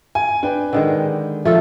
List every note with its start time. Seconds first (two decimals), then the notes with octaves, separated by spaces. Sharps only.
0.15 G#5
0.43 D4 B4 G5
0.73 D3 D#3 G#3
1.45 F3 A3 F4 A4